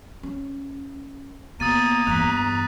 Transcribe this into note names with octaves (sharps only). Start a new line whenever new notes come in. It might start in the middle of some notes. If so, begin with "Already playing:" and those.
C#4
B2 A#3 A#5 D#6 A6 D#7
E2 G2 F#6 B6